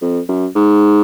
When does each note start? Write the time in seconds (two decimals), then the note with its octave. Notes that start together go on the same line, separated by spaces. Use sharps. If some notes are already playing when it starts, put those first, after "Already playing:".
0.02 F2
0.28 F#2
0.55 G#2